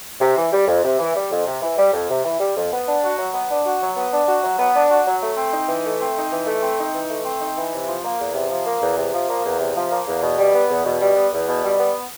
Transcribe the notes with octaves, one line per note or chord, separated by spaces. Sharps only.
C3
E3
G3
F2
C3
E3
G3
F2
C3
E3
G3
F2
C3
E3
G3
F2
B3
D4
F#4
F#3
B3
D4
F#4
F#3
B3
D4
F#4
F#3
B3
D4
F#4
F#3
A3
C4
D#4
E3
A3
C4
D#4
E3
A3
C4
D#4
E3
A3
C4
D#4
E3
C3
F3
A#3
E2
C3
F3
A#3
E2
C3
F3
A#3
E2
C3
F3
A#3
E2
B2
G3
B3
E2
B2
G3
B3
E2
B2
G3
B3